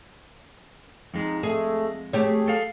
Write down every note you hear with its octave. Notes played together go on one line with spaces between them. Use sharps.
F2 G#3 D#4
A3 G#4
A3 G4 G#4 C#5
A4 F5